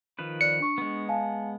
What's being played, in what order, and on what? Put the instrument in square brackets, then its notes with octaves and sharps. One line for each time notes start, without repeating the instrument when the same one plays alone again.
[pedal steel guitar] D#3 F3 B4
[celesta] D5 F#6 [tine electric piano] C#7
[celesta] D4 C#6
[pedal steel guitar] G#3 B3
[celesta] F5 G#5 A5